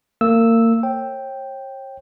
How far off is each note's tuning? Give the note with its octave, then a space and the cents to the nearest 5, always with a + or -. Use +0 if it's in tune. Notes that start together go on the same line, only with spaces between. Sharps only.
A#3 -35 E6 -5
C#5 -40 G5 +0